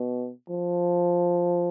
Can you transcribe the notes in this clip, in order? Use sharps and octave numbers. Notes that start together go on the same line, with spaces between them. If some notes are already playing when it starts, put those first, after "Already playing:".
Already playing: B2
F3